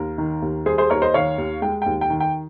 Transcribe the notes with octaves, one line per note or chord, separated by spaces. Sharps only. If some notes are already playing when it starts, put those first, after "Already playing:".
Already playing: D#2 A#4
D#3
D#2
G3 G#4 C5
G#4 C5
D#2 A#4 C#5
C5 D#5
D#3 C#5 F5
D#2
G#3 G5
D#2 G5
G5
D#3
G5